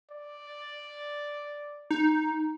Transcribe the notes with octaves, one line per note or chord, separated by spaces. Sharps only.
D5
D#4